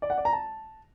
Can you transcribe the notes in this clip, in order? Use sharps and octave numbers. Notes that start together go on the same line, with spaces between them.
D5
F#5
D5
A#5
A5